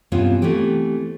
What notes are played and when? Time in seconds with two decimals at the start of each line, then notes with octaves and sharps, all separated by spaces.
0.12 G2 C3 E3 B3 C#4 F4
0.42 E3 A3 B3 C4 G4